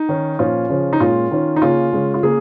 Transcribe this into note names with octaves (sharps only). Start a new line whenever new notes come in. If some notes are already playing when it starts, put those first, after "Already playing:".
Already playing: D#4
D#3 C#4
A#2 F3 C#4 F4
C#3 F3 C#4
D#4
A#2 G#3 C#4 F4
D#3 C#4
D#4
C#3 A#3 C#4 F4
C#3 G#3 C#4
F4
C#3 A#3 G#4